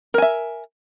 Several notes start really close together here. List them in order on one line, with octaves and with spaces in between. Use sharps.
A#4 G#5 E5